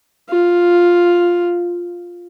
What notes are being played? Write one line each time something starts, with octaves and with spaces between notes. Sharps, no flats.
F4